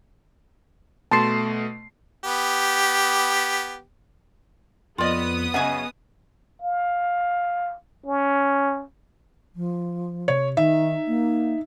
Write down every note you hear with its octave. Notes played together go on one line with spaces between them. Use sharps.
B2 A3 A5 C6 C7
B3 G4
F2 B3 F4 D5 D#5 D#6
F#2 C#3 D#5 F#5 G#5
F5
C#4
F3
C3 C#5
D#3 D#4 E5
A#3